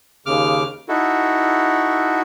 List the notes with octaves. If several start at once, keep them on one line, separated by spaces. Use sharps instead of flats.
D#2 C#3 D6 F6
D#4 E4 F#4 A4